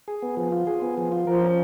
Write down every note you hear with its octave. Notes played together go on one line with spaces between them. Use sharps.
G#4
B3
F3
F4
G#4
B3
F3
F4
F3 A#4
C#4